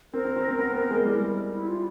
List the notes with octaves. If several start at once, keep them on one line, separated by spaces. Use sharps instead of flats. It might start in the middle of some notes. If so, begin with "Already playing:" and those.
C4 A#4
C4
C4
C4
B3
B3
G#3
G3 E4
E4
F4